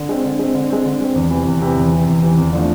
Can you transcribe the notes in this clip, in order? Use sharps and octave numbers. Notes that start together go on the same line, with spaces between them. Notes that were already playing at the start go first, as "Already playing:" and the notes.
Already playing: D3
G#3 C4
D3
G#3 C4
D3
G#3 C4
D3
G#3 C4
E2
C3 E3
E2
C3 E3
E2
C3 E3
E2
C3 E3
E2
D3 F3 A3